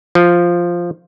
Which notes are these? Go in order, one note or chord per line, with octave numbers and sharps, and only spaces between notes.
F3